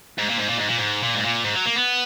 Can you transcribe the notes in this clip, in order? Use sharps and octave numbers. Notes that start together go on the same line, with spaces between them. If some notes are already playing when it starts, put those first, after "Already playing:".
G#2
A#2
G#2
A#2
G#2
A#2
G#2
A#2
G#2
A#2
G#2
F#3
A#3
B3